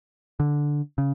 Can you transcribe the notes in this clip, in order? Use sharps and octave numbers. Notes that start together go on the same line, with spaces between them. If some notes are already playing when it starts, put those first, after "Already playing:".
D3
C#3